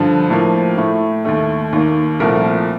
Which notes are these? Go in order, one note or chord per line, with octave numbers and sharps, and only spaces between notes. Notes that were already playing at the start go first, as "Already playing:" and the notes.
Already playing: G2 D3 F3
A2 F3 A#3
A2 A3
D#2 D#3 A3
D#2 D#3 A#3
C2 A#2 F3 A3 A#4